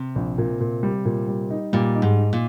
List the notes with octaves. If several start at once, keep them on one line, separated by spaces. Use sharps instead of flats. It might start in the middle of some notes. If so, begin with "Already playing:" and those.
Already playing: C3
A#1
A#2
A#2
G3
A#2
G3
D#4
A#2 G3
D#4
G#2
D#4
A#2